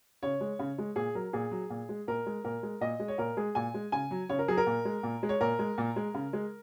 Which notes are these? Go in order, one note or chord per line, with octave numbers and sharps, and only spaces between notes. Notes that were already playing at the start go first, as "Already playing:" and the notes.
C#3 C#5
G#3
C#3
G#3
A#2 G#4
F#3 A#4
A#2 G#4
F#3
A#2
G#3
A#2 A#4
G#3
A#2 A#4
G#3
A#2 D#5
G#3
C#5
A#2 A#4
G#3 G#4
A#2 G#5
G#3
C#3 G#5
F#3
C#3 C#5
A#4
F#3 G#4
A#4
A#2
G#3
A#2
G#3
C#5
A#2 A#4
G#3
A#2
G#3
C#3
G#3